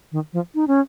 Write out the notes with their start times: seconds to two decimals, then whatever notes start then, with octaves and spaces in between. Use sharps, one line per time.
0.12 D#3
0.33 F3
0.55 D#4
0.68 C#4